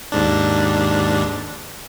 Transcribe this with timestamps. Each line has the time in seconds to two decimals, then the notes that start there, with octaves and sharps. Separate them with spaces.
0.12 D#2 G#2 D4